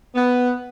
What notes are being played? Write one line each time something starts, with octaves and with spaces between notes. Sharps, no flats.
B3